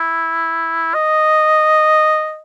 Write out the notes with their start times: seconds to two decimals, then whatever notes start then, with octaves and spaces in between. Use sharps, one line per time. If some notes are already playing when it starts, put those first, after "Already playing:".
Already playing: E4
0.94 D#5